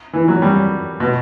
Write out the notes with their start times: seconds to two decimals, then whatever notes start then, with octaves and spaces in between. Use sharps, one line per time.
0.13 E3
0.28 F#3
0.42 G3
1.00 B2